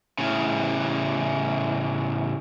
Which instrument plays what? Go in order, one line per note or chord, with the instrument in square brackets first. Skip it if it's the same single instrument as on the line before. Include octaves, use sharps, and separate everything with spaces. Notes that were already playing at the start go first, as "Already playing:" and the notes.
[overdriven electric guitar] A2 C#3